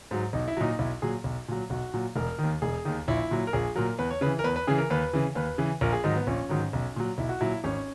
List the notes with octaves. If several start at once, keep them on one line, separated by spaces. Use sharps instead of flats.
G#2 F#3
B1 D#4
E4
A#2 F#3 D#4
B1 E4
A#2 F#3 G#4
B1
A#2 F#3
B1 F#4
A#2 F#3
E1 A#4
D#2 D#3
E1 G#4
D#2 D#3
A#1 E4
A#2 F#3
A#4
A#1 G#4
A#2 F#3 A#4
E2 B4
C#5
C#3 B4
E3
A#4
E2 B4
B4
C#3 E3 G#4
A#4
D#2 B4
C#3 E3
D#2 B4
C#3 E3
A#1 A#4
G#4
G#2 D#3 F#3 D#4
B3
A#1 C#4
G#2 D#3 F#3
B1
A#2 F#3
B1 E4
F#4
A#2 F#3 E4
G#1 C#4